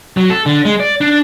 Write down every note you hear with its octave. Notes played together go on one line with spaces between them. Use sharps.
F#3
A4
D3
G#3
D5
D4